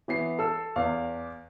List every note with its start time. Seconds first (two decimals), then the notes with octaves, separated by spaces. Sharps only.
0.08 E3 B3 C7
0.39 A4 E6
0.76 E2 F5